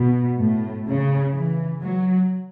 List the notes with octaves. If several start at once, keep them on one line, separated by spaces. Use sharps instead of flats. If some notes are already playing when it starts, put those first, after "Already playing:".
Already playing: B2
A2
C#3
E3
F#3